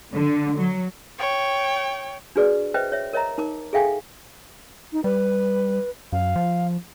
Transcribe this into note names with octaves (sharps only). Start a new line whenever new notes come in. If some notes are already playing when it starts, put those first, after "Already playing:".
D3
F#3
C#5 G5
D4 F#4 G#4 B4 D5
B4 C5 D#5 E5 G5
C#5 E5
A#4 C#5 D#5 E5 A#5
D#4 A#4 D6
G#4 A4 E5 F5 G5 G#5
D#4
G3 B4
F#2 F5
F3